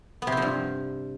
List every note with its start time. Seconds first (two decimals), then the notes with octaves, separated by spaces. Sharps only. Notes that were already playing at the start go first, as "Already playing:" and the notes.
0.22 B3
0.27 C3
0.32 C4
0.37 F3
0.42 G2